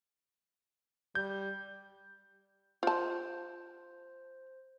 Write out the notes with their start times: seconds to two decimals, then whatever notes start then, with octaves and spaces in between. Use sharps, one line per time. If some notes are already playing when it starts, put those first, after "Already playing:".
1.15 G3 G6
2.83 F4 C5 A5